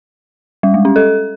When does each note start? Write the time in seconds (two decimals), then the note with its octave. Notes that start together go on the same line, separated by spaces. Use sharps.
0.63 G3
0.74 G#3
0.85 C#4
0.96 A4